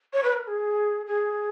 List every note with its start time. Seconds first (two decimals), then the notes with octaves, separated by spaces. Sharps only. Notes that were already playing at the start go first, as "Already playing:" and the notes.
0.13 C#5
0.23 B4
0.33 A#4
0.43 A#4
0.47 G#4
1.06 G#4